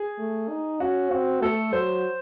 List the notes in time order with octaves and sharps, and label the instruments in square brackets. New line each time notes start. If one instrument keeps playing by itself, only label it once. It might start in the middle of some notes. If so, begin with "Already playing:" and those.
Already playing: [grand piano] G#4
[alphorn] A3
D#4
[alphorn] C#4 [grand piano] F#4
[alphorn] C4 [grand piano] F#4
[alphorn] A3 [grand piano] A4
[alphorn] F#3 [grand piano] C5